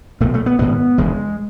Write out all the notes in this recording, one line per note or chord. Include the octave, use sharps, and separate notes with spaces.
B1 B2 A3
A3
B3
G#1 G#2 B3
E1 E2 C#3 G#3